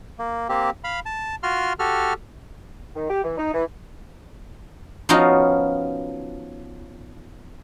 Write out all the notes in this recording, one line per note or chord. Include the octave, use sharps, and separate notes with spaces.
A#3
A#3 C4 G4
F5 B5
A5
F4 F#4 C6 F6
F#4 G4 A4 F6
D#3
G4
E3
D#4
E3
F3 B3 C#4 D#4 F4 F#4